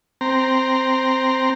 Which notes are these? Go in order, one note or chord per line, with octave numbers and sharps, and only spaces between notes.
C4 A#5